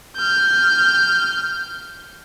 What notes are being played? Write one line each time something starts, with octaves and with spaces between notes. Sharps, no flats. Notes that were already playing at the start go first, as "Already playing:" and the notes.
F6 G6